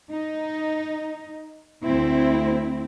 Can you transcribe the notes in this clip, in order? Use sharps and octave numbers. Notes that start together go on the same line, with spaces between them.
D#4
D2 C4 E4